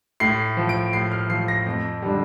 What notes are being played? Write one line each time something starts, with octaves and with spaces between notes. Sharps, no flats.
A2 C7
F3
D7
A2 C7
F6
F3 C7
A#6
F2
D3 G3